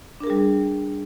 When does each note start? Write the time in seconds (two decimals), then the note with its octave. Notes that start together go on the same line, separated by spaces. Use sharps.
0.20 D4
0.24 A#4
0.27 G#4
0.30 G3